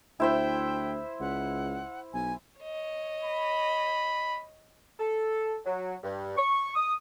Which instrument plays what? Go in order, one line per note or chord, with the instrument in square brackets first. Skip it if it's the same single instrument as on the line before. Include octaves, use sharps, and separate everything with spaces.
[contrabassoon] D2 [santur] E4 C5 E5 [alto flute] G5
[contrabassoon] C#2 [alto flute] F#5
[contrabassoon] B1 [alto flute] G#5
[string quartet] C#5 D#5
[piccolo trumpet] B5
[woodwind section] A4
F#3
G2
C#6
D#6